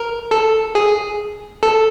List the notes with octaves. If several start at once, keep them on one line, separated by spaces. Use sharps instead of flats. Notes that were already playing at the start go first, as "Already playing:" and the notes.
Already playing: A#4
A4
G#4
A4